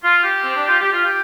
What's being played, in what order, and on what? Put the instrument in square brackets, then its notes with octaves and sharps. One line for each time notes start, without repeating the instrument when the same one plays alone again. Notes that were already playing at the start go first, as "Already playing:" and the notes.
[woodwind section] F4
G4
C4
D4
F4
G4
F4
G4